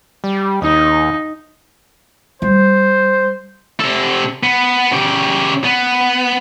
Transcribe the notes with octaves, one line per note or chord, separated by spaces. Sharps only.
G3
D#2 D#4
G3 C5
C3 A4
B3
C#3 G4
B3